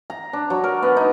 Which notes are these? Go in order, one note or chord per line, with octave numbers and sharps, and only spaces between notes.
A#5
D4
F#3
A#4
B3
D#4